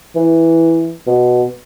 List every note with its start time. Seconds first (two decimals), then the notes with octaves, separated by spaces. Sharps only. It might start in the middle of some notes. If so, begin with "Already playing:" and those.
0.15 E3
1.07 B2